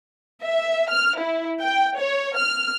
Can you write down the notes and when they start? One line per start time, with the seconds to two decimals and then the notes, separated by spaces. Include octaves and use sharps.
0.43 E5
0.90 F6
1.19 E4
1.62 G5
1.99 C#5
2.37 F6